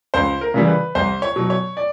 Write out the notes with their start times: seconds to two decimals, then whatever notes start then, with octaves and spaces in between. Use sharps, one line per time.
0.14 C#2 C5
0.41 A#4
0.54 C#3 E3 G3
0.68 B4
0.95 C2 C5
1.22 C#5
1.36 B2 F#3
1.50 C#5
1.77 D5